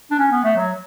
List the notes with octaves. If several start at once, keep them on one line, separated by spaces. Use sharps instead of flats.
D4
C#4
B3
A3
F#3